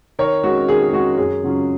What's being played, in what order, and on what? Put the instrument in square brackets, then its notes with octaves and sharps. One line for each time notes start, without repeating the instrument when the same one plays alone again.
[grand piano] D#3 A#4 C#5
G#3 C#4 F#4
D#3 G#4
G#4
G#3 C#4 F#4
F#2 G#4
C#3 F#3 C#4 F4